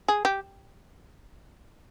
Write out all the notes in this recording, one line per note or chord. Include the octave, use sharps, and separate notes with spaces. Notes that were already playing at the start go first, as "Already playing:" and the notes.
G#4
G4